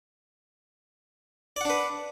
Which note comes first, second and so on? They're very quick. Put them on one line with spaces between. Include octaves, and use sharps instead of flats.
D5 F#5 D4 B4